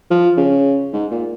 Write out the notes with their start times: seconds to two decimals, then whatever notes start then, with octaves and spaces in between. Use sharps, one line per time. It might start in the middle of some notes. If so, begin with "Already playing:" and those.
0.11 F3
0.37 C#3
0.93 G#2
1.11 A#2